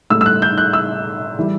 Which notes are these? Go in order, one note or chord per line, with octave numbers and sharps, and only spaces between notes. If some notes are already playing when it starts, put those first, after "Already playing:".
A2 G3 E6
E6
F#6
G6
F#6
E6
E3 G3